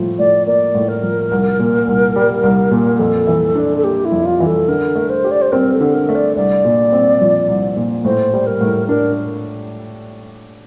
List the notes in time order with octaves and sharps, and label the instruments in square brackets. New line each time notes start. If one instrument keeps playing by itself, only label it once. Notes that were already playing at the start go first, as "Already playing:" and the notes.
Already playing: [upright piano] A2 F3
[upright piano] A2 [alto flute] D5
[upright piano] A#3 [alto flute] D5
[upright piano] A2
[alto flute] A#4
[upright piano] F3
C2
A#2
C2
G3
C2
A#2
[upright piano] F2 [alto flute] A4
[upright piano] E3
D4
[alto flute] A4
[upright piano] A#3 [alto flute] G4
[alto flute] E4
[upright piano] F2
[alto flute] F4
[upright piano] E3
[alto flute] A4
[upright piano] D3 [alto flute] A#4
[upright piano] A3
[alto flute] C5
[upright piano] G4
[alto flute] D5
C5
[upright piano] C4 [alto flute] A#4
[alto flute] A4
[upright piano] D3
[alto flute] A#4
[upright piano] A3
[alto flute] D5
[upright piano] C2 [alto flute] D5
[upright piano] A#2
C4
F3
C2
A#2
[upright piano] A2 [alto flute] C5
[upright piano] G3
[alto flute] A#4
[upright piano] A2
[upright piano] D4 [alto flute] A#4